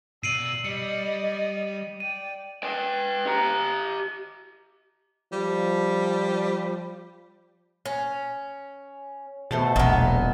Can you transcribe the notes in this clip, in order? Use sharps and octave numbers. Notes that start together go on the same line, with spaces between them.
B2 D5 E6 C7 D7 D#7 F#7
G3 D5 D#5 C#7
D5 G5 D#7
B4 G5
G4 A#5
F3 G3
C#4
B2 A3 C5 A5
E1 B1 A#2 B3 D#5